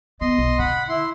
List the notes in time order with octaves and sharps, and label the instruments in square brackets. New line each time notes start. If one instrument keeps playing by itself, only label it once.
[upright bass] B3 [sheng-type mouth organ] D#5 C6
[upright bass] B1
[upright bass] D3 [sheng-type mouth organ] F#5 B5
[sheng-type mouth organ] E4 C6